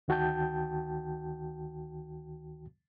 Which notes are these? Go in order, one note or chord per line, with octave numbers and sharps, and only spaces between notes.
D2 D#3 F#4 G5 A5 G6